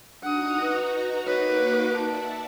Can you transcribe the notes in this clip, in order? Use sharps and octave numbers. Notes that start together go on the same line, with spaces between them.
D4 D#4 F#4 F#5 A#5 D#6
B4
A#3 D#4 F#4 B4 C#5 D6
D5 E5 F#5 A5